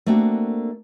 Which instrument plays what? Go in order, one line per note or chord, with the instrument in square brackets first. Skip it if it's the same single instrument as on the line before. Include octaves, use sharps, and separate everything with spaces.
[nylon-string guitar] A3 A#3 C4 D4 F#4